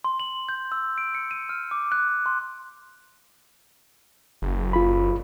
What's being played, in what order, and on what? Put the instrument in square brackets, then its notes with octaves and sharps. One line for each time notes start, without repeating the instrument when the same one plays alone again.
[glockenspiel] C6
F#7
G6
E6
D7
C#7
D#7
F6
D6
F#6
C6
[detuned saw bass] F#1
[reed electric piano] F4 B5